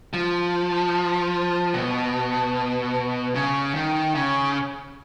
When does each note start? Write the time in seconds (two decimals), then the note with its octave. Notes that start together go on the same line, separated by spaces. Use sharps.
0.13 F3
1.74 B2
3.35 C#3
3.75 D#3
4.15 C#3